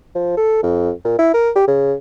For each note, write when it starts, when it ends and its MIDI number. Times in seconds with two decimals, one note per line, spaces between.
0.15 0.36 53
0.37 0.60 69
0.63 0.91 41
1.05 1.18 46
1.19 1.29 64
1.34 1.50 70
1.56 1.67 67
1.68 1.94 49